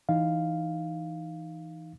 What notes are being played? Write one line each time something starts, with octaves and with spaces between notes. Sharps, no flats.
E3 D#4 F5